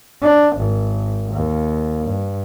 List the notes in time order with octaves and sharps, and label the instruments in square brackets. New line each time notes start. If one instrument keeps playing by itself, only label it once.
[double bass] D4
G#1
D#2
G2